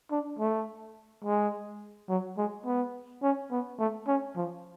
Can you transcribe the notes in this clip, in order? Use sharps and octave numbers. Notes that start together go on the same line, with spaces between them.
D4
A3
G#3
F#3
G#3
B3
C#4
B3
A3
C#4
F3